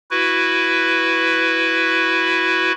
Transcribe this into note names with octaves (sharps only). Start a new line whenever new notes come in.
E4 F#4 B4